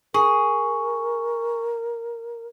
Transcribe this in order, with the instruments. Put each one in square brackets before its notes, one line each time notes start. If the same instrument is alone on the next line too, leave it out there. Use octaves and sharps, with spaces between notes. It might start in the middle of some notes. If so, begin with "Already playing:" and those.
[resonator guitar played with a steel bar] G#4 [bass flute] A#4 [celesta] C#6